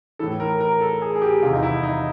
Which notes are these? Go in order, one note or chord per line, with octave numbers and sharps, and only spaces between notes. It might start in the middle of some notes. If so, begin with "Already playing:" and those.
A2 E3 A4
A#4
A#4
A4
G#4
G#4
G4
E2 C3 D#3 F4
D#4
E4
D#4